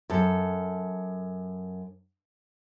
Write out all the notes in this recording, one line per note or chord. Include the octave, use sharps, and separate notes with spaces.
F#2 A4